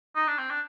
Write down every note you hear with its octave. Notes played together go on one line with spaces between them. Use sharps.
D#4
D4
C4
D4